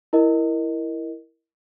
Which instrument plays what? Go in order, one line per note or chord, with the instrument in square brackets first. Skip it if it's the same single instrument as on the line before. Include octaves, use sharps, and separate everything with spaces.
[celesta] E4 A#4 D#5